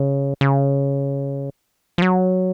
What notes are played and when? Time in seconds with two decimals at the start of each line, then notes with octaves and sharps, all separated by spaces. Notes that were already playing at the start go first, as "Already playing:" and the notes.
Already playing: C#3
0.41 C#3
1.98 F3
2.02 F#3